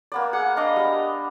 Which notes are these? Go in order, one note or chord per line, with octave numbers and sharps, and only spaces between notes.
A#3 B3 D5
G#4 F#5
D4 D#5 F5 D6
G3 B3